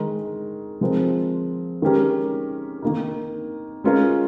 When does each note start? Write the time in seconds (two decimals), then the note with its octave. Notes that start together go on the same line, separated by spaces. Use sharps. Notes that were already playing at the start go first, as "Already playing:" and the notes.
Already playing: D#3 G#3 D#4 A#4
0.81 F3 G#3 C4 F4 A#4
1.82 D#3 G#3 C#4 G4 A#4
2.82 D#3 A#3 D#4
3.84 G#3 C#4 F4 A#4